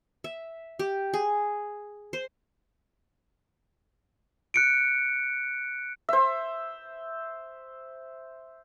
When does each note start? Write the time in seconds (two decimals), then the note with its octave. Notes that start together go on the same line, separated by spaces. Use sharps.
0.24 E5
0.79 G4
1.14 G#4
2.13 C5
4.54 F#6 C#7 D7
6.09 C5 E5